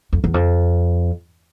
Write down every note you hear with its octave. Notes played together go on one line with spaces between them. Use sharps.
F2
E2
F2